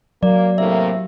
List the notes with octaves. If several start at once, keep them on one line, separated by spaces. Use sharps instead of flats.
F#3 A#3 D5
A2 C3 A#3 E5